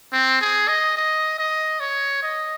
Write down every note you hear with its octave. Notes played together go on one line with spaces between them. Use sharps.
C4
G#4
D#5
D#5
D#5
C#5
D#5